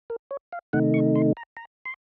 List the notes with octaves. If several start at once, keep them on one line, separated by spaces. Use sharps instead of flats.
A#4
C#5
F5
C3 D#3 A3 D#4 F#5
C#6
C6
A#5
A#5
C6